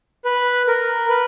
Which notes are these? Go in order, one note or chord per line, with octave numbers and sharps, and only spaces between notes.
B4
A#4
B4